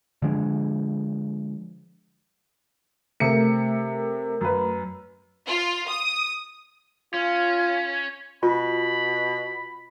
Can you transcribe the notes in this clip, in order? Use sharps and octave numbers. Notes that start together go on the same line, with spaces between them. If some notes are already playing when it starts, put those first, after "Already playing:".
D3 F3 G#3 D4
C3 A3 A#4 E5 C#7
F#2 B4
F4
D#6
C#4 F4
B2 F4 B5